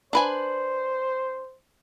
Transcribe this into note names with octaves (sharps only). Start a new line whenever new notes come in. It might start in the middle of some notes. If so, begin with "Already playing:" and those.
D4 B4 C5 G#5